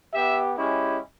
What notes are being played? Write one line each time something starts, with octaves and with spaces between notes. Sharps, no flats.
B3 G4 E5
G#3 C#4 E4 G4